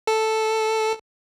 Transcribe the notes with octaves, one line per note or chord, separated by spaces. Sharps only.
A4